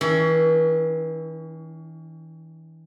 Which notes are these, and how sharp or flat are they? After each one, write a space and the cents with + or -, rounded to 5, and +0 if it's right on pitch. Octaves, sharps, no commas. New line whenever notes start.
E3 -40 C#4 +35 E4 +20